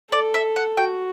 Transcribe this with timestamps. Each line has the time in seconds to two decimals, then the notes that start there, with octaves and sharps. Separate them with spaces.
0.12 A4 D5
0.34 E5
0.56 F#5
0.77 F#4 G5